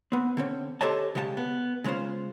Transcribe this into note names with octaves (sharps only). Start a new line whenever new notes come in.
B3 C4
D3 C4 C#4
G4 A4 C5 C#5 D#5 A5
C#3 G#3 G4 F#5 A5
B3
C#3 G#3 C#4 F4 C5